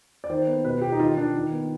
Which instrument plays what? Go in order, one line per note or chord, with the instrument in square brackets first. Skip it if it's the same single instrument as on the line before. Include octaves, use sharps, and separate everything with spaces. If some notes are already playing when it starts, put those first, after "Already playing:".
[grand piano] D5
D#3 C5
B3
B2 B4
B2 G4
D#4
D#3 F4
D#3 D4
D#3
B3